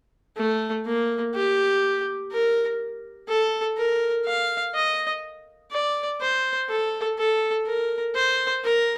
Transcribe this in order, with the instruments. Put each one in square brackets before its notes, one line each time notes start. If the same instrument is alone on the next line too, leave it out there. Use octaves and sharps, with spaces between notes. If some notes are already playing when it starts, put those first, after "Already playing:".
[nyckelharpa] A3
A#3
G4
A#4
A4
A#4
F5
D#5
D5
C5
A4
A4
A#4
C5
A#4